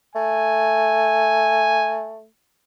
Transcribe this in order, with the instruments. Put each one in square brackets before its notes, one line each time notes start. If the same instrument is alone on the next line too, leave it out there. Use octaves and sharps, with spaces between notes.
[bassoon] A3 [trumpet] G#5